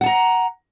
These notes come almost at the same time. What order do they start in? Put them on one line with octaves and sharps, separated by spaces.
F#5 A5 A#5